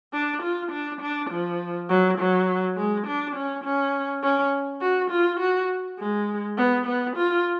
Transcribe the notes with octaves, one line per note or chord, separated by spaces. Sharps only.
D4
F4
D4
D4
F3
F#3
F#3
G#3
D4
C#4
C#4
C#4
F#4
F4
F#4
G#3
B3
B3
F4